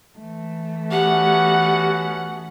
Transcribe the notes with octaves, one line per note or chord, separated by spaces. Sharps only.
E3 A3
B3 C#4 F#4 G4 F#5